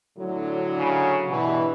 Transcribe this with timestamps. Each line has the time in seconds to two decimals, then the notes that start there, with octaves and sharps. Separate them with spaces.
0.18 A2 D3 F#3
0.78 C#3
1.29 G2 B2 E3 G4